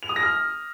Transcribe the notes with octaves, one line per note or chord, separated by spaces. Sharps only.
F7
D#6
A#6
F6